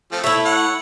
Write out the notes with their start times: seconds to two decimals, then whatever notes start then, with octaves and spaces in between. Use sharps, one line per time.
0.12 F3 A3 C4
0.24 A3 E4 C#5 E5
0.45 C#5 F#5